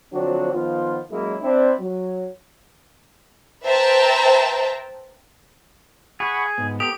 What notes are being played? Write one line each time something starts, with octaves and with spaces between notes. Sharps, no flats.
D3 F3 F#3 C4 D4 F#4
D#3 F3 B3 F4
F#2 F#3 G#3 A#3 E4
C4 D4 E4
F#3
B4 C5 E5 G5 A5 A#5
G#4 F#5 B5 C#6
G#2 B3
B3 G4 A4 D#6